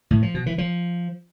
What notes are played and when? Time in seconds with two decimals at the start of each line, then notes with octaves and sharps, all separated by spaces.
0.11 A2
0.22 F3
0.34 B2
0.46 E3
0.58 F3